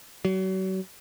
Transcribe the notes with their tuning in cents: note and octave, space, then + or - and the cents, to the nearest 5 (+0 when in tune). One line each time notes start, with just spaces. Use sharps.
F#3 +35